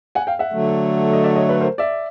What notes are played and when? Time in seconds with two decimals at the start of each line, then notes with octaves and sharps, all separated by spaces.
0.15 F#5 G#5
0.27 F5 G5
0.39 E5 F#5
0.52 D3 F#3 A3
1.13 D#5
1.24 D5 E5
1.36 C#5 D#5
1.49 B4 C#5
1.61 A#4 C5
1.78 D5 E5